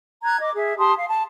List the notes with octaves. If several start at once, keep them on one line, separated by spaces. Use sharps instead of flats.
A#5 F#6 G#6
D#5 D6
G#4 E5
G4 A5 C6 D#6
F5
A5